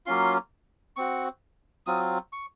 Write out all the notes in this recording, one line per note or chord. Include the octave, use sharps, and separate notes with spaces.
F#3 A#3 C#4 F4 C6
C4 F#4 C#6
F#3 C4 F4 D#6
C#6